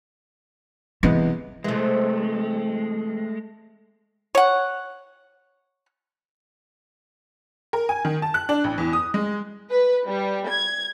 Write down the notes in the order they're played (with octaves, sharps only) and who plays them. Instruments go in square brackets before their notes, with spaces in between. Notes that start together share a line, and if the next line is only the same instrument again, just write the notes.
[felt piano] C3 G#3 B3 [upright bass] E3
[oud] C3 E3 [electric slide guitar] G#3 A3
[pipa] C#5 F#5
[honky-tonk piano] A#4
G#5
D#3
A5
F#6
D4
A1
E2
D#6
G#3
[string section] B4
G3
G#6